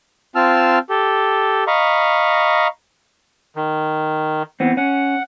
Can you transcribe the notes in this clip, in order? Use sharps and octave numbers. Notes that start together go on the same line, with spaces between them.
C4 F4 A5 E6 F6
G4 A4
D#5 F5 A#5 B5 C#6
D#3
E3 B3 C4
C#4 F#5